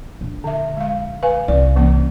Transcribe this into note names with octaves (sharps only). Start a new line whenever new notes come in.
A#1
D3 E5
G#3 F5
B4 F5 G#5
C2 C4 D5
E3 A#3 C#4